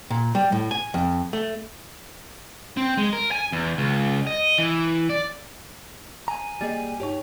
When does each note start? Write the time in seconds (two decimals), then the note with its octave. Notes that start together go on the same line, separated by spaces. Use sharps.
0.10 A#2
0.35 G3
0.52 A2
0.71 G#5
0.94 F2
1.33 A3
2.77 C4
2.97 G#3
3.13 A#4
3.31 G#5
3.52 E2
3.78 C#2
4.27 D#5
4.58 E3
5.10 D5
6.28 G#5 A#5
6.61 G3 A#3 G#4 D#5 A6
7.00 G2 D#4 G4 C#5